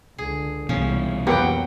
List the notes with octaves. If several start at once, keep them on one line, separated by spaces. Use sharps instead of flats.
C#2 D3 G#4
C2 B2 E3 F3 C#4
F2 F#3 A#3 B3 G4 F#5 G5